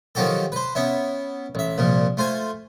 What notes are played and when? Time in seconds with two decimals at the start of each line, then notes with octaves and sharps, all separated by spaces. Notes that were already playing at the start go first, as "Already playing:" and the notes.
0.15 D#3 F3 F#3 F#4 G4 A4
0.52 B4 C5
0.75 B3 C#4 E4
1.55 A1 E5
1.78 C2 A#2 F3
2.17 A3 F4 C5 G#5